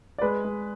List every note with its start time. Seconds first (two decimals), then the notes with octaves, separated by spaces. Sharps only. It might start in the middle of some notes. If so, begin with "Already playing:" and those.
0.18 D5
0.22 G#3 B4
0.44 G#3